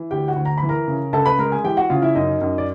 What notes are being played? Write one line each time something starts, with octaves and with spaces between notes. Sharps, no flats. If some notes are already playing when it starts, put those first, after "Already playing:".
Already playing: E3
D2 G4 G5
F#4 F#5
D2
A#5
B5
E3
A#4 A#5
C#3
C#2 A4 A5
B4 B5
G#3 A#4 A#5
G#4 G#5
E3 G4 G5
F#4 F#5
C#3 F4 F5
E4 E5
F#2 D#4 D#5
F#2
D5